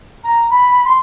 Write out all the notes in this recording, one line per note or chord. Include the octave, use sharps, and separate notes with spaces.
A#5
B5
C6